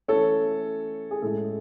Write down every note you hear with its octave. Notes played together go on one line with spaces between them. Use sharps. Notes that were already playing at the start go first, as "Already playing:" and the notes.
E3 A3 C#4 A4 C#5
G#4
A2 G#3 C#4 A4